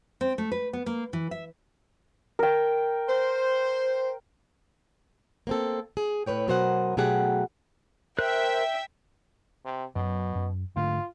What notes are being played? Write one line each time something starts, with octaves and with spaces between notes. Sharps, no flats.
C4
A3
B4
B3
A#3
E3
E5
A#4 G5
C5
A#3 C4 A4
G#4
A2 B4 C#5 G5
B2 F#3 A#4 C5 D#5 F#5
B2 F#3 A3 G4 G#4 F#5
A#4 C5 E5 G5 F#6
C3
F#2 B2 F#3
F#2
G#2 D3 A3 F4